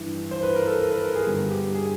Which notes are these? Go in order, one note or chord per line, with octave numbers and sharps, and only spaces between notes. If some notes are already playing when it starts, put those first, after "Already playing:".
Already playing: G2 E3 G3
C5
B4
A#4
A4
A#4
B4
A#4
G#4
G2 D3 G3
G4
G#4